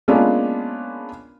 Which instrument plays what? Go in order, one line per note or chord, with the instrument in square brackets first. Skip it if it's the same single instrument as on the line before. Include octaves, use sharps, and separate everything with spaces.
[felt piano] G#3 A#3 B3 C#4 D4 F4